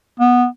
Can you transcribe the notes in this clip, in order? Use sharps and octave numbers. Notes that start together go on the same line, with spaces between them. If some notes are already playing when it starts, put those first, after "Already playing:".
B3